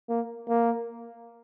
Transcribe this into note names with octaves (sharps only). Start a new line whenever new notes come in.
A#3
A#3